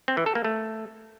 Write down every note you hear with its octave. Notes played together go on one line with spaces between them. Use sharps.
C4
E3
A4
A#3
A3